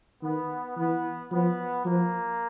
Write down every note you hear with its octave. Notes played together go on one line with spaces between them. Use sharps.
D#3 B3
E3 B3
F3 B3
F3 A#3